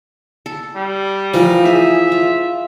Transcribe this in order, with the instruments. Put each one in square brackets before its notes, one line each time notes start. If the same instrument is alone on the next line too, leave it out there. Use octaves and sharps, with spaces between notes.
[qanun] A4
[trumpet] G3
[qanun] E3 A3 A#4 [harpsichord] F3
[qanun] G#4 [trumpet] E5
[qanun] F4